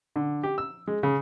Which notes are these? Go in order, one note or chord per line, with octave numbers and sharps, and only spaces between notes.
D3
G4
E6
G#3
C#3